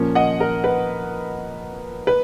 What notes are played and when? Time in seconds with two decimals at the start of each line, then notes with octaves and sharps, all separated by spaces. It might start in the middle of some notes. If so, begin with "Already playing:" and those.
Already playing: A#2 F3 A#3 C#4
0.15 D#5 F#5
0.40 A#4
0.64 B4
2.07 B4